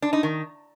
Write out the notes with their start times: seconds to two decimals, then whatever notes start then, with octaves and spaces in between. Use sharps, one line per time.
0.02 D4
0.13 D#4
0.23 D#3